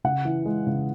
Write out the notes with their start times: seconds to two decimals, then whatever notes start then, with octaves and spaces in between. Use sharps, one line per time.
0.04 C#3 F#5
0.25 E3
0.45 G#3
0.67 C#3